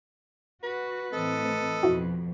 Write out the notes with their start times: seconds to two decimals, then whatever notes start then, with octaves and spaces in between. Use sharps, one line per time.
0.63 F#4 B4
1.13 A2 E3 C4 A4 D#5
1.83 F2 B2 E4 F#4